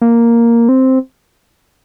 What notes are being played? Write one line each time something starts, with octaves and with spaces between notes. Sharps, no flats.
A#3
C4